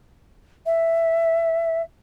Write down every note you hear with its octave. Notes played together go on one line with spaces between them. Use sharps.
E5